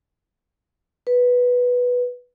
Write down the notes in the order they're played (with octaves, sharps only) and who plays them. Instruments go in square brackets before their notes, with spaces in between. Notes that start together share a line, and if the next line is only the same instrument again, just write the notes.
[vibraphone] B4